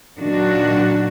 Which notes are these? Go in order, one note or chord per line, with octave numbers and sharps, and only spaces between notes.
A#2 D#3 F#3 D4 F#4